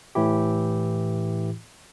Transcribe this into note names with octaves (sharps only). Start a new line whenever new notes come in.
A2 E3 E4 G4